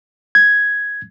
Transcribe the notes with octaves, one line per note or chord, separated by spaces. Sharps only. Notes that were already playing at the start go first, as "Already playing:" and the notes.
G#6